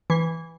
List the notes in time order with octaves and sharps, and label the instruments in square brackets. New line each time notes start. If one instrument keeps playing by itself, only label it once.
[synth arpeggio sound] E3